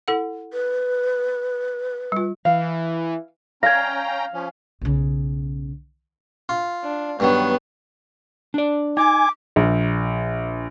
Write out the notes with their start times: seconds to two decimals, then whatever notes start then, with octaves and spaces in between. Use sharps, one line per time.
0.08 E4 A4 F#5
0.53 B4
2.12 G3 F4
2.45 E3 F5
3.63 C#4 F5 G5 A#5 G#6 A#6
4.33 F3 C#4
4.81 B1 C#3
6.49 F4
6.83 D4
7.20 G2 D#3 F#3 B3
8.54 D4 D5
8.97 D#4 G#5 D6
9.56 A#1